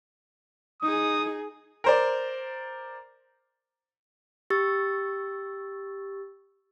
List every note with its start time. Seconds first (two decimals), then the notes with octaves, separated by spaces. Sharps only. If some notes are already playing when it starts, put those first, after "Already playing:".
0.83 D#4 G#4 D#6
1.84 A#4 C5 D5
4.50 G4 C#6 E6 A6